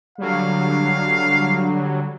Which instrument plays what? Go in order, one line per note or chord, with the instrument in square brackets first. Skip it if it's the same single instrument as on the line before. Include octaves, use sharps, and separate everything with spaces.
[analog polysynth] D3 F#3 G3 [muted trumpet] F5